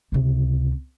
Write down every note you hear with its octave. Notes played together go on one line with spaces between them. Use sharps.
C#2 C3